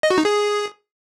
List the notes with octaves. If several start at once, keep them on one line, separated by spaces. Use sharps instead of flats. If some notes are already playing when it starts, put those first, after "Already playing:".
D#5
F#4
D#4
G#4